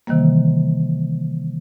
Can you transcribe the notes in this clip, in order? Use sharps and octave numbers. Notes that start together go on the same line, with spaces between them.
C3 D#3 E3 G3 A#3